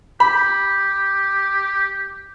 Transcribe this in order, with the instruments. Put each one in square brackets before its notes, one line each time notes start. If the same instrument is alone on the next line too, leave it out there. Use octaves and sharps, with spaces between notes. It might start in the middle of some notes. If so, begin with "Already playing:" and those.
[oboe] G4 [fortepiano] B5